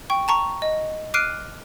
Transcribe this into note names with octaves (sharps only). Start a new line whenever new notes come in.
G5 C#6
A5 A#5 C#6
D#5
D6 F6 F#6 C7 D7 D#7